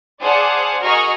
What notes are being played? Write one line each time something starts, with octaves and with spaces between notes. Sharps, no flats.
G#4 C5 D5 F5 F#5 A5
F#4 G#4 A#4 D#5 C#6 F6